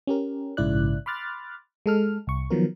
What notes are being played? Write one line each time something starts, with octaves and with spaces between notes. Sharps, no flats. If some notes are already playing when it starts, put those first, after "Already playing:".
C#4 G4 A#4
A#1 G#2 C#3 E4 D5 F#6
B5 C6 D6 F6 F#6 A6
G#3 A4 F6
C2 C#6
D#3 F3 F#3 B3 A#4